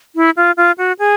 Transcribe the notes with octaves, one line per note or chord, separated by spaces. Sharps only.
E4
F4
F4
F#4
G#4